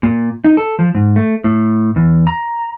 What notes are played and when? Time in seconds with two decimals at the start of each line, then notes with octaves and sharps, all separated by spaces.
0.03 A#2
0.44 D#4
0.57 A4
0.79 F3
0.94 G#2
1.16 A3
1.44 A2
1.96 E2
2.27 A#5